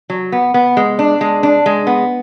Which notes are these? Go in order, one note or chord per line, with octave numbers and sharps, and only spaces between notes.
F#3
B3
B3
G#3
D4
G#3
D4
G#3
B3